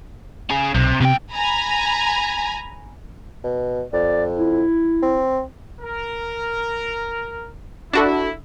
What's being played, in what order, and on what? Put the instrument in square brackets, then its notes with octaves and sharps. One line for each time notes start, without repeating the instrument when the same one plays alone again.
[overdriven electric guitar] C#4 G#4
[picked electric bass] B1 [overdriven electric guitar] C3
[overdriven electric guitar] E2 G5 [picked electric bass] C3
[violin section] G#5 A#5 B5
[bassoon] B2
[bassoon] F2 [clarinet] D5
[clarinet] E4
[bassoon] C4
[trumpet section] A#4
[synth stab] D4 F#4 A4 [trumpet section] E4